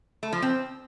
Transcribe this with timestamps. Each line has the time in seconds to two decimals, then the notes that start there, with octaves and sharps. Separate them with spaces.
0.23 A3
0.33 F3
0.42 C4